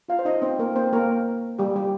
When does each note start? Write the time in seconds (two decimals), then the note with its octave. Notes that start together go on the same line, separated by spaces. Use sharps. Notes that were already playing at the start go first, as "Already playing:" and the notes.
0.08 F4 F5
0.19 C5
0.25 D#4 D#5
0.42 C4 C5
0.59 A#3 A#4
0.76 C4 C5
0.93 A#3 A#4
1.59 G3 G4
1.76 G3 G4